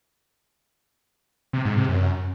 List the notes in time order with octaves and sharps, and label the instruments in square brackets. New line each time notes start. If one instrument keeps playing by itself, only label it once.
[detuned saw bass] C3
G#2
C3
F#2